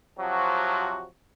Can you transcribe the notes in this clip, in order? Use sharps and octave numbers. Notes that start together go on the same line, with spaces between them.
C3 F3 F#3 F#4